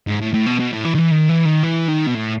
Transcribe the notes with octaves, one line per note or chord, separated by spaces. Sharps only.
G#2
A2
A2
B2
B2
A2
E3
D#3
E3
D#3
E3
D#3
E3
D#3
B2
A2